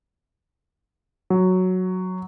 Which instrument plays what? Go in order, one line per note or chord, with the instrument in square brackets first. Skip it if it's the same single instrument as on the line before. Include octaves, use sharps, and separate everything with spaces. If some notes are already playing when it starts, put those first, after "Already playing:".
[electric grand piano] F#3